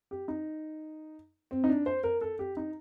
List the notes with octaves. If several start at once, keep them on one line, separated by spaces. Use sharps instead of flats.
G4
D#4
C4
D#4
D4
C5
A#4
A4
G4
D#4